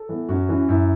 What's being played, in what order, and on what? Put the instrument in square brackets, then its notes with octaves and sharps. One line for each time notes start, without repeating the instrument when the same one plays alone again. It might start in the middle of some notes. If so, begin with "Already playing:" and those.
Already playing: [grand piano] A4
E3 B3
F#2 C#4 F#4
E3 C#4
F#2 E4